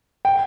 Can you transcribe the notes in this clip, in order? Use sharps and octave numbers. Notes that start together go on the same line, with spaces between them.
G5